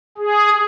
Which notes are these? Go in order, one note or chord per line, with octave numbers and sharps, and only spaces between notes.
G#4